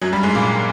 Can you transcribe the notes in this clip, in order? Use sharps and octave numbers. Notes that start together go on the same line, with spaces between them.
F#2 F#3
G2 G3
G#2 G#3
A#2 A#3